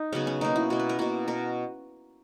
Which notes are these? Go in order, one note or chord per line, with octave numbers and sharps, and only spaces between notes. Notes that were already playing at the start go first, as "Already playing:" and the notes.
Already playing: D#4
C#3 F#3 B3 C#4
C#4
B2 A#3 D#4
E4
B2 A#3 F#4
B4
A#4
B2 A#3 F#4
B2 A#4